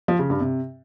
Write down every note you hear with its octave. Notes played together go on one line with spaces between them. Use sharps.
F3
C#3
G2
C3